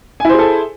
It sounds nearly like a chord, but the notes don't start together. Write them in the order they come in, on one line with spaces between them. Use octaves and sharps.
G#5 E4 C5 G#4 A4